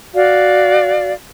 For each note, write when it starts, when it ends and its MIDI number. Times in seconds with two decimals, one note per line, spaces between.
0.14 1.13 66
0.14 1.13 74
0.14 1.13 77